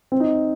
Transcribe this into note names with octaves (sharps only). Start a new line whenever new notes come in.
C4
D#4